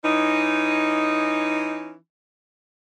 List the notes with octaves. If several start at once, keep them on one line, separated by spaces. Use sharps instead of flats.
E3 C#4 D#4